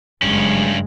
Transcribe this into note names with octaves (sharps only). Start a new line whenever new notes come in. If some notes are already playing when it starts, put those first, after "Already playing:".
F#1 G2 G#3 C#4